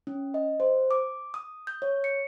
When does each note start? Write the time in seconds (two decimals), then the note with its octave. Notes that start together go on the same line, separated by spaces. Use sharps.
0.07 C#4
0.34 D#5
0.60 C5
0.91 D6
1.34 D#6
1.67 G6
1.82 C#5
2.04 C#7